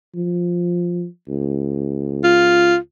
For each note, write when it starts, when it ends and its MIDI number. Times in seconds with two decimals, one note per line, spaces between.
0.15 1.06 53
1.28 2.76 37
2.24 2.77 65